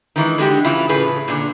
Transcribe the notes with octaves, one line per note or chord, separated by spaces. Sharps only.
D#3 E3 G#3
D3 G#3 F#4 G4
C#3 E3 E4 F4
A2 C#3 G#4 B4
A#2 D3